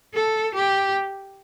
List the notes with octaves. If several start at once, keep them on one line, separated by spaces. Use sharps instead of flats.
A4
G4